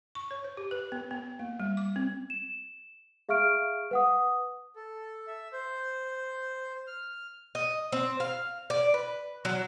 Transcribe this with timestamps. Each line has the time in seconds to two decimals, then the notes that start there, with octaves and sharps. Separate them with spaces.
0.15 C#6
0.31 C#5
0.44 C5
0.57 G4
0.71 B4
0.92 B3
1.11 B3
1.39 A#3
1.60 G3
1.77 D6
1.96 C4
2.30 E7
3.29 G#4 E5 F5 C#6 F6 D7
3.91 B4 F#5 D#6
4.76 A4
5.27 E5
5.53 C5
6.87 F6
7.55 D#5
7.92 C4
8.20 F5
8.70 D5
8.94 B4
9.45 F#3